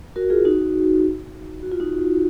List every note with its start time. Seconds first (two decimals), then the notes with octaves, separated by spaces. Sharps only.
0.16 F#4 A#4
0.30 F4 G#4
0.45 D#4 F#4
1.63 F#4
1.72 F4
1.80 D#4 F#4